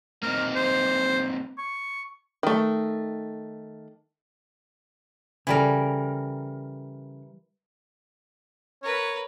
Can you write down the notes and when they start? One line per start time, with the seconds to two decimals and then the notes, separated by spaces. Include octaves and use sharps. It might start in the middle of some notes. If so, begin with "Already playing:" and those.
0.23 A#3 C4 D#4 A#4
0.56 C5
1.58 C#6
2.43 D#3 A3
5.47 C#3 E3 G3 A4 A#4
8.83 A#4 B4 C#5